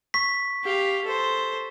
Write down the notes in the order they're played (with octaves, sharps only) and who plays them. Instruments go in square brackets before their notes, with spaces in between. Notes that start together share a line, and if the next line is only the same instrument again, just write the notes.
[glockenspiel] C#6 B6
[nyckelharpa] G4 F5
A4 C5